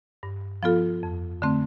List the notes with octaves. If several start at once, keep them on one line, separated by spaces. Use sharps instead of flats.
G2
F3 B3 F4 A4
F2
D3 A3 C4